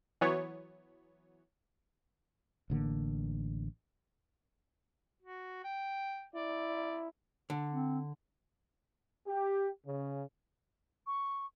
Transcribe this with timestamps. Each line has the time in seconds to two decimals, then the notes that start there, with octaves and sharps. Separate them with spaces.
0.21 E3 F#3 B3 C#5
2.70 A1 D3 G3 A#3
5.22 F#4
5.64 G5
6.35 E4 D5
7.50 D3
7.73 C4
9.27 G4
9.86 C#3
11.07 C#6